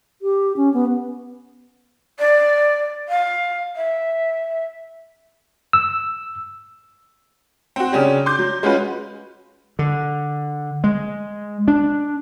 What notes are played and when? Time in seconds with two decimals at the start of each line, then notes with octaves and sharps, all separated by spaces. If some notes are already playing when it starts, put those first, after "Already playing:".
0.22 G4
0.57 C#4
0.74 B3
2.19 D5
3.09 F5
3.76 E5
5.73 E6
7.76 C4 F#4
7.92 C#3 F#3 C#4 D4 G4
8.26 C6 D6 G6
8.39 F#3
8.63 G#3 C#4 F4 F#4 B4
9.79 D3
10.84 G#3
11.68 D4